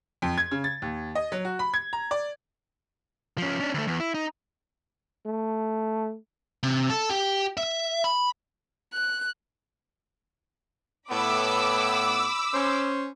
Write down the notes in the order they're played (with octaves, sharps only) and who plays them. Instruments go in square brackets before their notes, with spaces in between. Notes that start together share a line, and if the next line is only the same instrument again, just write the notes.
[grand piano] F2
G#6
C#3
A6
D#2
D#5
F#3
F#4
B5
G#6
A#5
D5
[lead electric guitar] F3 C#4
C#4 D4
D2 A3
E2
E4
D#4
[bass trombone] A3
[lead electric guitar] C3
A4
G4
E5
B5
[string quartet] F#6
[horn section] A2 B3 [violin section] B5 D6 E6
[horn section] C#4 C5